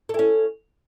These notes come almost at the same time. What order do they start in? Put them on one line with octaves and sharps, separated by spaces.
A4 E4 C#4